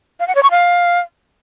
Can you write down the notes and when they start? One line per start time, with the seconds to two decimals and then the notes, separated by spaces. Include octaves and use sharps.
0.20 F5
0.28 F#5
0.35 C#5
0.43 C#6
0.51 F5